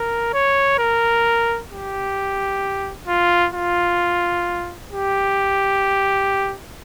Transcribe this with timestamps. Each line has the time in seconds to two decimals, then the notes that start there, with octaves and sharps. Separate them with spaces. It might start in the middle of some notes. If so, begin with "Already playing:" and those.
Already playing: A#4
0.33 C#5
0.79 A#4
1.71 G4
3.07 F4
3.53 F4
4.91 G4